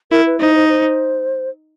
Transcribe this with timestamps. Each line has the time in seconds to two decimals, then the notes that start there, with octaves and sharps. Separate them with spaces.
0.11 E4 A#4
0.26 B4
0.40 D#4 C5
0.55 C5
0.69 C5